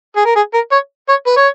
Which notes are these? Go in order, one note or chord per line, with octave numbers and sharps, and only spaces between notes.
G#4
A#4
G#4
A#4
C#5
C#5
B4
C#5